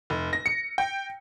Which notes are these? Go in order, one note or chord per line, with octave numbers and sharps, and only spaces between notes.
F1
A#6
C#7
G5